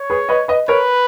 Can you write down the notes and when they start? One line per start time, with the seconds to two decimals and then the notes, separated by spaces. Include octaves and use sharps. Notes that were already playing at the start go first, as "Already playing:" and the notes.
Already playing: C#5
0.10 G#4 B4
0.29 B4 D#5
0.48 B4 D#5
0.68 A#4 B4 C#5